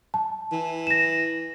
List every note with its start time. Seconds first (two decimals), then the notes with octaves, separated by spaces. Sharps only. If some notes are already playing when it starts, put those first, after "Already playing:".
0.14 A5
0.52 E3
0.87 A#6 E7